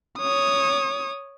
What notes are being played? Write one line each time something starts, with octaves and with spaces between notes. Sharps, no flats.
C#5 D#6